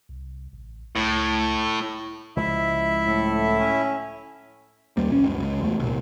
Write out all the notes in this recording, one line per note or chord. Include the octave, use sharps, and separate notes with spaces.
C2
A1
C#2 A2
C#2 F3 G#3 E4 E5
A2 A4
C#4
D#2 G3 A#3
A#1 C#4
F#1 C#2
C#2
E2 A3
C2 A#2